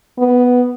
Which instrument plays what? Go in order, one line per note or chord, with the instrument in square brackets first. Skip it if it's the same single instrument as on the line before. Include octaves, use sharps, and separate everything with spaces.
[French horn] B3